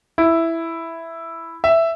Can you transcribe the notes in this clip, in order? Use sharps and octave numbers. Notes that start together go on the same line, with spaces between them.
E4
E5